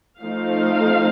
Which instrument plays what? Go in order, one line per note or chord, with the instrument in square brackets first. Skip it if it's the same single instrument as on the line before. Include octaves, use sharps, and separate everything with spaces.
[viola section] F3 A3 C4 D#4 F5